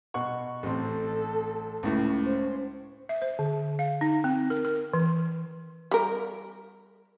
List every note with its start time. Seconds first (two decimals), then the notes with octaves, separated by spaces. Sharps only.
0.14 B2 F#5 C#6
0.63 A1 C4 A4
1.83 C#2 A2 C#3
2.25 C#4 C5
3.09 E5
3.22 C5
3.39 D3
3.79 F5
4.01 D#4
4.24 C4
4.50 A#4
4.65 A#4
4.93 E3
5.91 G3 A#4